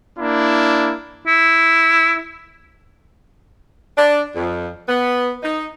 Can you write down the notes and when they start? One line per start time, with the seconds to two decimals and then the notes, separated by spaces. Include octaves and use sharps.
0.17 A#3 D4 E4
1.27 E4
3.97 D4
4.36 F2
4.88 B3
5.43 D#4